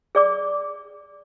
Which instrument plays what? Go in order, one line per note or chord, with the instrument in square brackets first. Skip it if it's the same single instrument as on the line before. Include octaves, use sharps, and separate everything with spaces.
[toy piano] G#4 D5 D6